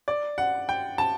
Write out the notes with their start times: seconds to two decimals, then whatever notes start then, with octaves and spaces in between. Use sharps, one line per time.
0.08 D5
0.38 F#5
0.69 G5
0.98 A5